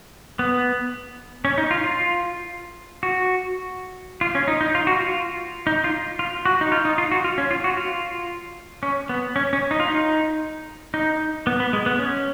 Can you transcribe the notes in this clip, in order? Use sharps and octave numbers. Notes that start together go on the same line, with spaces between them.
B3
C#4
D#4
F4
F4
F#4
F4
C#4
D#4
D#4
F4
F#4
F4
D#4
F4
F4
F#4
D#4
F4
D#4
F4
F#4
F4
C#4
F4
F#4
F4
C#4
B3
C#4
C#4
D#4
F4
D#4
D#4
B3
B3
G#3
B3
C#4